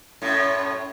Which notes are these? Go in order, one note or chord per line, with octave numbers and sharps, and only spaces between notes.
F#2 A2